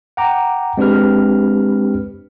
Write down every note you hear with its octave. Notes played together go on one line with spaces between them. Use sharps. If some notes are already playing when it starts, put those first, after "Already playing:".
F#5 G5 A#5 D6
G#3 C4 D4 G4 B4 F6